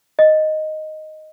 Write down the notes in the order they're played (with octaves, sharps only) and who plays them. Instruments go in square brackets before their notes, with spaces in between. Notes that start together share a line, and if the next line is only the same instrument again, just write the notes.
[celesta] D#5